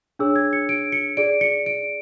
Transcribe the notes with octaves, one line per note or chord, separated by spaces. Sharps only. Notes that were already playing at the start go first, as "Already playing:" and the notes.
D4 G#4 C#5 E6
G#6
C#7
D7
C#7
G#4 D5 D7
C#7
D7